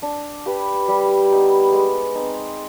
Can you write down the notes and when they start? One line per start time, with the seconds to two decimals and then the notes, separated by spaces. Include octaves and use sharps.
0.02 D4
0.46 G4 B4
0.88 G3
1.30 B3 D#4 G4
1.73 G#3
2.15 C4 D#4